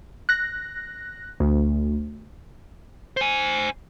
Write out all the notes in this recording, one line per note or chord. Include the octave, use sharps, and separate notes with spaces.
F#6 A#6
D2
C5 G#5